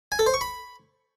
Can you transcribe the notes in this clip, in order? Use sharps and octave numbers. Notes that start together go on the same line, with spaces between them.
G#5
A4
C5
C#6
B5